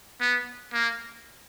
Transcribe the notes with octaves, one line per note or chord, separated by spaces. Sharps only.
B3
A#3